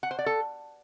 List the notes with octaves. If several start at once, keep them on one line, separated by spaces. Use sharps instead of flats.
F#5
C5
D5
A4